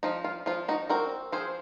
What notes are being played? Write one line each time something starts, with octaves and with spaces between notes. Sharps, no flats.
F3 D#4
F4
F3 F4
D#4 F#4
C4 F#4 A#4
F3 G#4 C5